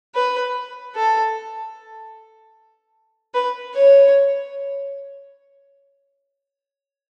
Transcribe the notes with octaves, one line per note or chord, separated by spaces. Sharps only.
B4
A4
B4
C#5